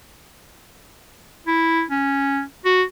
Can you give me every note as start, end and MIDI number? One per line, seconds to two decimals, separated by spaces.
1.47 1.83 64
1.91 2.42 61
2.65 2.83 66